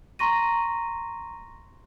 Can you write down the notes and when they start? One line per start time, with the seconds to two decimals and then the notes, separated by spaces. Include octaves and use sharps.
0.19 A#5 C6 C#6 A#6 D#7